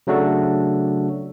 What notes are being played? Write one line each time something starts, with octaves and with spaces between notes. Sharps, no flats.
C#3 F#3 A3 D4 F#4 A4